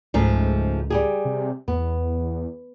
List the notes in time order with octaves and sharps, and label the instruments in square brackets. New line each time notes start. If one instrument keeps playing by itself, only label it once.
[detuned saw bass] C#2 [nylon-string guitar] G#2 F3 A3
[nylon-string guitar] G3 G4 G#4
[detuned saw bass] C3
[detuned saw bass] E2 [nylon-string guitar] B3